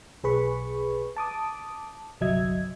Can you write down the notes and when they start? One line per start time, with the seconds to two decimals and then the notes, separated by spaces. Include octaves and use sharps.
0.24 B1 G#4 B4 B5 C#6
1.16 A5 D6 D#6
2.21 G1 C2 F#3 D#5 E5 G#6